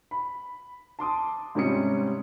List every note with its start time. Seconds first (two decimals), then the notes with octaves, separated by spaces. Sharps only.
0.11 B5
0.99 A5 C6 D6 D#6
1.55 G#2 C3 G3 C#4 D#6 C#7